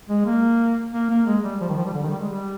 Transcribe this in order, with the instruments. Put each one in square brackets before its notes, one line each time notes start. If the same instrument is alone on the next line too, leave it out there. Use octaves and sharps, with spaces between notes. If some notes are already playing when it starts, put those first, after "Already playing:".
[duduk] G#3
A#3
A#3
A#3
G#3
G3
F3
D#3
F3
G3
D3
D#3
G3
G#3
G3